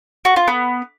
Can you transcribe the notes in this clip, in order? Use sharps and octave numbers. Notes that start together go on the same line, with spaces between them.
F#4
F4
B3